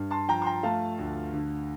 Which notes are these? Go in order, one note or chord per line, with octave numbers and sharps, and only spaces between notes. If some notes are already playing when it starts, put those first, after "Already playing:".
Already playing: G2
A5 C6
F3 G5 A#5
C6
G5 A#5
A3 F5 A5
D2
D3